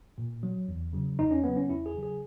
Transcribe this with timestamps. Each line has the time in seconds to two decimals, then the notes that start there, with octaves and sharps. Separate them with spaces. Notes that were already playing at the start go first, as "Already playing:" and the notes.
0.18 A#2
0.43 F#3
0.68 E2
0.93 C#3 F#3
1.19 E2 D#4
1.31 C#4
1.44 C#3 F#3 B3
1.56 C#4
1.69 E2 E4
1.86 G#4
1.94 C#3 F#3
2.03 G#4